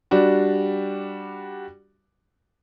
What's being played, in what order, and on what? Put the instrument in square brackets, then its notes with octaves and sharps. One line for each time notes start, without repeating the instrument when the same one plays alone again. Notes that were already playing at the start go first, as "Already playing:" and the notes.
[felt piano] G3 D4 F#4